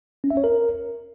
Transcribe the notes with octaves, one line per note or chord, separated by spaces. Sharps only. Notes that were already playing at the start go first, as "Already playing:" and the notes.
C#4
E5
C#5
A#4